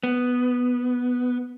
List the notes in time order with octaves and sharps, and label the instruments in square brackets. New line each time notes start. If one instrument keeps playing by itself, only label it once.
[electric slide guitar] B3